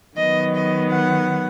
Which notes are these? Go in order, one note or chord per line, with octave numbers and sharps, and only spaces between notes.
D#3 F#3 B3 D#5
D#5
F#5